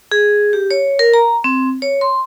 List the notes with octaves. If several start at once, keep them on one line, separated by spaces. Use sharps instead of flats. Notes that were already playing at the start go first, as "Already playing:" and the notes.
G#4
G4
C#5
A#4
A#5
C4
C#5
C6